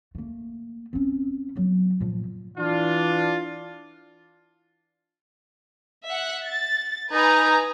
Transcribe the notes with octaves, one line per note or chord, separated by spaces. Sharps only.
A3 A#3
C4 C#4
F#3 B3
A#2 F3
E3 D4 F4
E5 F#5
A6
D#4 B4 G#5 A#5